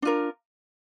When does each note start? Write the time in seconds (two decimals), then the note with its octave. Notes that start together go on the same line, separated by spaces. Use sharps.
0.02 D4 F4 A#4